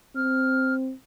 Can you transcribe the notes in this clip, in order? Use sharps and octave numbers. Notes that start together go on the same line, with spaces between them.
C4 F6